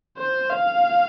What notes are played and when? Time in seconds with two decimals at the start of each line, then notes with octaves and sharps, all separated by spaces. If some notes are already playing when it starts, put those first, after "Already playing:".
0.17 C5
0.49 F5